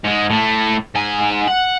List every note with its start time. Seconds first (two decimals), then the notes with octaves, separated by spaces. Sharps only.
0.04 G#2 G#3
0.30 A2 A3
0.95 G#2 G#5
1.47 F#5